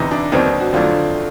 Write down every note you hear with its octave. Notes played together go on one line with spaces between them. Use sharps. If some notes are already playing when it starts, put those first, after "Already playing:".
Already playing: E2 C3 E3 D#4
D4
D#2 D#3 F#3 B3 C4 D4
F#4
F2 D3 F#3 A3 D4 F4